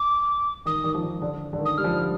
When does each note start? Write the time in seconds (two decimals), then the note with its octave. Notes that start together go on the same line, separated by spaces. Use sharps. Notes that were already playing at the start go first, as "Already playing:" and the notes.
Already playing: D6
0.66 D#3 D#6
0.84 D#3
0.95 F3
1.02 D#3
1.22 D3
1.53 D3
1.59 D#3
1.65 D#6
1.77 G3 F6
1.84 F3
1.91 G3